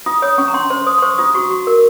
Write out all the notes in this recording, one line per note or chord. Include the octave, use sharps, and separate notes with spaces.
F4 D#6
C#5 D#6
C#4 C#6
A#5
C#4 C6
C5 C6
C5 D#6
C6
C5 C#6
F4 D#6
F#4 C#6
F#4
A#4